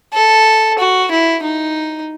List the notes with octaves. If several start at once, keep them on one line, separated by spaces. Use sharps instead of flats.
A4
F#4
E4
D#4